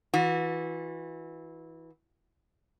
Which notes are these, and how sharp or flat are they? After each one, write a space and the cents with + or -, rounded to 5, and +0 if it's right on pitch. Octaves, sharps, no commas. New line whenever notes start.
E3 -15 F#4 -35